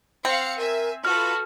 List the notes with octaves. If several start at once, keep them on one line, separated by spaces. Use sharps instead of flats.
C4 F5 F#5 C#7
A#4 E5 G#5
F4 F#4 A4 B4 F6